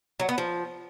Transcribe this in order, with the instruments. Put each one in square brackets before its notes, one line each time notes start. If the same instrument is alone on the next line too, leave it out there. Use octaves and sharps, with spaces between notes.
[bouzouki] F#3
B3
F3